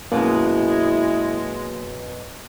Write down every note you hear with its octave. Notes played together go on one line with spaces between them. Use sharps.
F#2 B2 G#3 A#3 E4